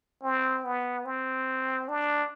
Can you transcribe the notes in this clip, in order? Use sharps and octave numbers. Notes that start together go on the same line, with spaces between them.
C4
B3
C4
D4